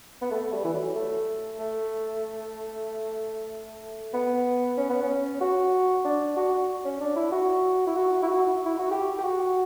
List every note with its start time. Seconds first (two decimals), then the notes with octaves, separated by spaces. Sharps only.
0.21 B3
0.31 A3
0.53 G3
0.64 E3
0.74 F#3
0.95 A3
1.59 A3
4.14 B3
4.77 C#4
4.90 B3
5.03 C#4
5.41 F#4
6.05 D4
6.36 F#4
6.85 C#4
7.00 D4
7.16 E4
7.32 F#4
7.87 E4
7.96 F#4
8.22 E4
8.28 F#4
8.65 E4
8.78 F#4
8.91 G4
9.18 G4
9.23 F#4